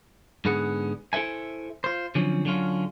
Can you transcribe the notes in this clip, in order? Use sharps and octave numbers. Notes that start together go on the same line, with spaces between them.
G#2 D3 B3 G#4 F#5
E4 A4 C5 E5 G#5
F4 C5
D3 F3 F#3 C4 C#4
D3 F#3 C#4 F4